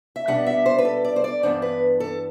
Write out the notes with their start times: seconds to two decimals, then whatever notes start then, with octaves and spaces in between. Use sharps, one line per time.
0.16 E5
0.28 B2 G3 D4 F#5
0.46 E5
0.66 C5
0.78 B4
0.85 A4
1.05 D5
1.16 C5
1.24 D5
1.43 G2 E3 B3 D4 C5
1.62 B4
2.00 A4